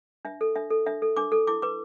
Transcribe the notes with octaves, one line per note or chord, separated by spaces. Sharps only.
D4 E5
A4
D4 E5
A4
D4 E5
A4
D4 D6
A4
E4 D6
B4 D6